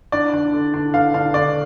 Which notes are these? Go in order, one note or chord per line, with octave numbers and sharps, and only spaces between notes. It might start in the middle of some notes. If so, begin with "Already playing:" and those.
D4 D5
D4
D3
D4
D3 F5
D4 F5
D3 D5